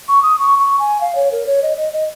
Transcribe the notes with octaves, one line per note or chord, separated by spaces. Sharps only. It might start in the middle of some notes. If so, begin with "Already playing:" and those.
C#6
D#6
C#6
C#6
G#5
F5
C#5
A#4
C#5
D#5
D#5
D#5